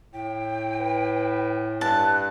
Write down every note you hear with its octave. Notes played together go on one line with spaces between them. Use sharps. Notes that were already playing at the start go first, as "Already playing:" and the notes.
A2 G5
B4
G2 A5 F#6